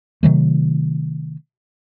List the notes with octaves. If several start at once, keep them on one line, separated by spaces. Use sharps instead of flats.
C3 D#3 F#3 A3